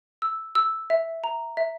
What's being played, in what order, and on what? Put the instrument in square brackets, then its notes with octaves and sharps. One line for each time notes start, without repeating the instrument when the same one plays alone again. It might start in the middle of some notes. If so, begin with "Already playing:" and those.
[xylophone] E6
E6
E5
A#5
E5